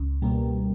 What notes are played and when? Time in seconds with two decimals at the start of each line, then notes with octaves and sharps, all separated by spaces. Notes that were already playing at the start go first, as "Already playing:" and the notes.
Already playing: C#2
0.22 B2 G3 A#3